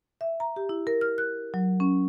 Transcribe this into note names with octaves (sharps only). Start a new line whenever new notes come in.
E5
A#5
G4
E4
A#4
F6
F#6
F#3
C#4